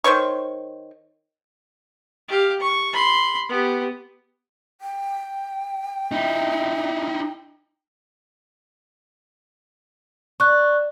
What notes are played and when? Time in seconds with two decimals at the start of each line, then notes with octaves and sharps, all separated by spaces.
0.04 D#3 C5 C#5 C#6
2.28 G4 F5
2.60 C#6
2.93 B5 C6
3.48 B3 G4
4.81 G5
6.12 D#4 E4
10.40 D4 C#6 F#6